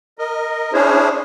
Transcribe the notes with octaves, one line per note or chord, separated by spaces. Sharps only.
A#4 D#5
C#4 D4 E4 G#4 C5 C#5